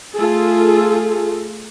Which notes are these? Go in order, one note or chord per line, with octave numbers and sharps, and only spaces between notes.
A3 F4 G#4 A4